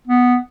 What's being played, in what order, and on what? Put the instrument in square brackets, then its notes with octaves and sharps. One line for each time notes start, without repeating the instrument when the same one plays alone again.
[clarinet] B3